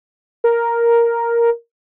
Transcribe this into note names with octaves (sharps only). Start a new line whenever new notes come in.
A#4